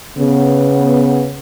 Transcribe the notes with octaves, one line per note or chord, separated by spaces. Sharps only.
C#3 B3